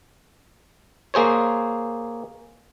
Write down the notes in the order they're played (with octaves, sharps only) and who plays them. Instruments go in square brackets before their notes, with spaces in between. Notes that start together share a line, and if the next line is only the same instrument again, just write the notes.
[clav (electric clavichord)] A#3 G#4 C5 C#5